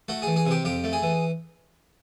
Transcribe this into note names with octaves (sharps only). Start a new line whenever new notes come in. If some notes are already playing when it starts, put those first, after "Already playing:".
A3 F#4
E3 G#4
G#4
C3
G4
F2 G4
A3
G#4
E3